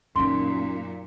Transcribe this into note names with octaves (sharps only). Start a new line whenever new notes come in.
F#2 A#2 C#4 D#4 C6